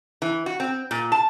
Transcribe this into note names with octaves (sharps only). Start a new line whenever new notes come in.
E3
F#4
C4
A#2
A5